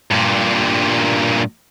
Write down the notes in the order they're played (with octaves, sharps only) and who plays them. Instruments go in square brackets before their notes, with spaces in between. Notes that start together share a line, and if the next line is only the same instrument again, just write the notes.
[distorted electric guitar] G2 A#2